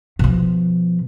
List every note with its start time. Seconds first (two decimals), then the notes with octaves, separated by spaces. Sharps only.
0.19 B2 F3